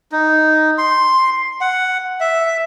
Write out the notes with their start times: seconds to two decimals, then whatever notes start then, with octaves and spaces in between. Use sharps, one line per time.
0.12 D#4
0.78 C6
1.61 F#5
2.20 E5